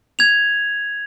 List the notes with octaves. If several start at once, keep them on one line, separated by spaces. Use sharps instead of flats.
G#6 F7